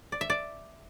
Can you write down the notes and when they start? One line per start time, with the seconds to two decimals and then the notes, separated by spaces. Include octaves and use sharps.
0.12 D5
0.21 E5
0.30 D5